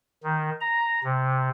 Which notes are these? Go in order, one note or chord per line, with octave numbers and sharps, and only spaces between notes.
D#3
A#5
C3